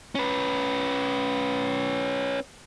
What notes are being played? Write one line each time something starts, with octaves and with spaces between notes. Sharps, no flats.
C#4 B4